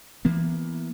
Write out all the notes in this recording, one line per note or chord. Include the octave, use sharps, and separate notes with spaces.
E3 A#3 B3